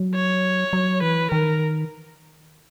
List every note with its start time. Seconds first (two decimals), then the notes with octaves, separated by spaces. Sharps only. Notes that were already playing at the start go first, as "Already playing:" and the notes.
Already playing: F#3
0.15 C#5
0.73 F#3
1.02 E3 B4
1.31 D#3 A#4